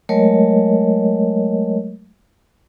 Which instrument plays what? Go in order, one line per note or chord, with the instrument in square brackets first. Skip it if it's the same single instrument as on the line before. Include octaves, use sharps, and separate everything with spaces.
[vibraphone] F#3 G#3 A3 A#4 C#5 D#5